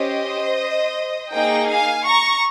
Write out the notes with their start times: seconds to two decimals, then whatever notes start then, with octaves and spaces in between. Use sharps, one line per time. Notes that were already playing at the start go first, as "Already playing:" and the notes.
Already playing: C#4 G4 C5 D#5
1.31 A#3 D#4 G#4 D#5 G5
1.68 F5 G#5
2.05 A#5 C#6